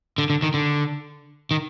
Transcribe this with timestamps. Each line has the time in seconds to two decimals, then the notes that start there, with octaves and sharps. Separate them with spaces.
0.18 D3
0.30 D3
0.42 D#3
0.54 D3
1.51 D#3